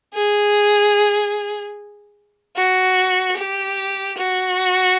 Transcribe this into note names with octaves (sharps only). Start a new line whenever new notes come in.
G#4
F#4
G4
F#4